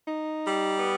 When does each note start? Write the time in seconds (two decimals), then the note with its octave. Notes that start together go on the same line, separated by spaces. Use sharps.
0.08 D#4
0.44 G3
0.79 B3